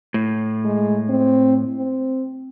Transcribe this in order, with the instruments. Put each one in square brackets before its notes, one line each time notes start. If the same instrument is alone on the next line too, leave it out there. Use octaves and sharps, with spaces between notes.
[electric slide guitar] A2
[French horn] G#3
C4
C4